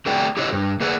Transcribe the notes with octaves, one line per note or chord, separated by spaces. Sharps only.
A3 C4 F#4 G#4 D5 G5
E4 G4 A4 C5 C#5 D#5
G2
A#3 G#4 B4 D5 F#5